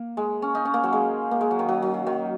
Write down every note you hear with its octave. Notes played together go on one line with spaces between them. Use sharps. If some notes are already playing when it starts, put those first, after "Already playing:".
Already playing: A#3
G#3
C#4
D#4
C#4
A#3
F#3
G#3
A#3
G#3
F#3
D#3
F#3
F#3
F#3
D#3